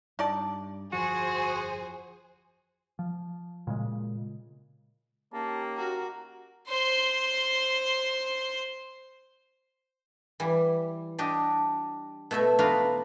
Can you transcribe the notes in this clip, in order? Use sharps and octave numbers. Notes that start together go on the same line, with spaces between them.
G2 D#4 D5 A5
G1 F2 F3 F#4 G#4 C5
F3
A#2 C#3 G#3
A#3 C#4 D#4 G4 A5
F#4 A#4
C5 C6
E3 G3
D4 G4 D#5
B2 A3 E5
D#4 F4 F#4 B4 D5 F5